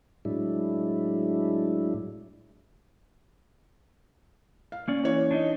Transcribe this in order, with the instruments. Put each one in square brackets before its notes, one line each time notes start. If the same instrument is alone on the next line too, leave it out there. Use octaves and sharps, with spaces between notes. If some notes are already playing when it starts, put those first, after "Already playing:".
[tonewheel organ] A2 F#3 G#3 D4 E4
[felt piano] F5
[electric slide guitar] A#3 C#4 D5
[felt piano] E3 C#5
[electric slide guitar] D4 D#4 D#5